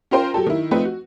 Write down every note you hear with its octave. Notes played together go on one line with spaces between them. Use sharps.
C#4 F4 A#4 C5 G5 C6
F#3 G4 A4
D#3 E4
F3 A3 C4 D#4 B4
F#4